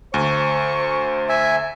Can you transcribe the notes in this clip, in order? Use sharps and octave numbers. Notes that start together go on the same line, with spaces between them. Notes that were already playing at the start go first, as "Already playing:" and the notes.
D2 C5 C#6
E5 G#5